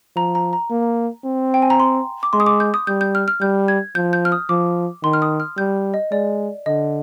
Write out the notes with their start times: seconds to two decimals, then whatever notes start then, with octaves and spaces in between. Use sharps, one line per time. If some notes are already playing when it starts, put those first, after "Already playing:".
0.16 F3 A#5
0.35 A#5
0.53 A#5
0.71 A#3
1.24 C4
1.54 G5
1.62 G#5
1.70 A#5
1.80 C6
2.23 D6
2.33 G#3 C6
2.40 D#6
2.46 D6
2.60 G6
2.74 D#6
2.87 G3 G6
3.01 G6
3.15 F6
3.28 F6
3.41 G3 G6
3.68 G#6
3.95 F3 G6
4.13 G6
4.25 F6
4.32 D#6
4.49 F3 D6
5.04 D#3 C6
5.13 F6
5.22 D#6
5.40 F6
5.58 G3 G6
5.94 D#5
6.12 G#3 D5
6.66 D3 D#5